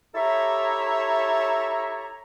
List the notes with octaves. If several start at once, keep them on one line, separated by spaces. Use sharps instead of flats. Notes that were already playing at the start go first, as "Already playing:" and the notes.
E4 G4 A4 C#5 E5 A#5